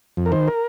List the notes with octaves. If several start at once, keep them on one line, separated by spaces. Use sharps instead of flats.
F2
A#4
D#3 C5
A#4